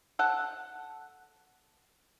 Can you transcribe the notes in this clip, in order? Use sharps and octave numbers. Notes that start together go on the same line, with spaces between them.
A4 F#5